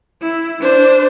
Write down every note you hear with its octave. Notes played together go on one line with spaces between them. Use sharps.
E4
D4 C5